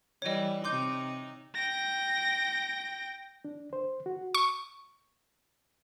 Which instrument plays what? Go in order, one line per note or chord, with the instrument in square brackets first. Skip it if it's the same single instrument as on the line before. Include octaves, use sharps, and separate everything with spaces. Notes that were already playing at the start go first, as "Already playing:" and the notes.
[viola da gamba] E3 G3 [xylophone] C#5 D#5
[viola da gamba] C3 D#4 [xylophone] C6 D6 G6
[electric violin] G5 A#6
[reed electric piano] D4
C5
F#4
[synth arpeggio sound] C#6